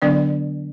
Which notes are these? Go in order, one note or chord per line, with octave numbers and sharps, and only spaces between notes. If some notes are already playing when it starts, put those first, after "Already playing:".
D3 F#3 B3 D4 D5